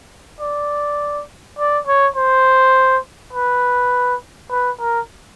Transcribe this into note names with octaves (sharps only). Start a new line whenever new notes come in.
D5
D5
C#5
C5
B4
B4
A#4